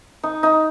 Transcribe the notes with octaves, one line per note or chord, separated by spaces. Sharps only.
D#4
D#4